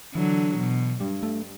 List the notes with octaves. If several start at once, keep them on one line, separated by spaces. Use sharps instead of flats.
D3 E3 F#3
B2
G2 G3
A3